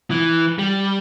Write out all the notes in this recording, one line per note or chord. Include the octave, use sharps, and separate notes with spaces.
E3
G3